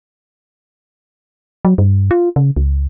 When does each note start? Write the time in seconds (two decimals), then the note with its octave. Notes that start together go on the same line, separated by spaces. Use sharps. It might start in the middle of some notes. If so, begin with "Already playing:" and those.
1.65 F#3
1.78 G2
2.11 F4
2.36 C#3
2.57 C#2